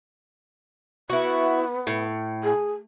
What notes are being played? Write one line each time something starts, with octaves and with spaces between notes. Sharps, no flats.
B3 E4 F#4
A2
G#4